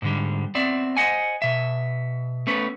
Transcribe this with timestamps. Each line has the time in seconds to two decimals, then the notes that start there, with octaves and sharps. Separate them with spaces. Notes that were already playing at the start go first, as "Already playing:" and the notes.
0.02 G#2 D3 G3
0.55 B3 C4 D5 E5
0.97 C5 D#5 F#5 G#5
1.42 B2 E5
2.47 A3 B3 C#4 B4